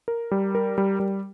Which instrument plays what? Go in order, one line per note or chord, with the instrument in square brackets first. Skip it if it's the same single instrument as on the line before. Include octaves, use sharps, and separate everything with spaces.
[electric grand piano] A#4
G3
A#4
G3
G3